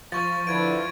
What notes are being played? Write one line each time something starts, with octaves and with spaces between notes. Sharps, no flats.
F3 C#6 A6
D3 E4 B4 G#6 D7